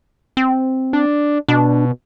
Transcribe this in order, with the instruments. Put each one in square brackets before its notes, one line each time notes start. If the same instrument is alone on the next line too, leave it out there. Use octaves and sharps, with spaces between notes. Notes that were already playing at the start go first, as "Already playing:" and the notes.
[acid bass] C4
[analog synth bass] D4
[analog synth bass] B2 [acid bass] D4